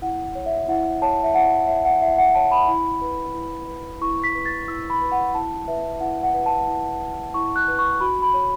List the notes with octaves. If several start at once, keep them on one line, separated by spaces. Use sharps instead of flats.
E4 F#5
C#5
E5
E4 F#5
C#5 A5
E5
E4 F#5
F#5
C#5 E5
F#5
E4 E5
F#5
C#5 A5
B5
E4
B4
E4
B4
E4 C#6
B6
B4
A6
E4 E6
B5
B4
F#5
E4 A5
B4 E5
E4 F#5
F#5
B4
A5
E4
B4
E4 C#6
F#6
B4
C#6
F#4 B5
B5
C#5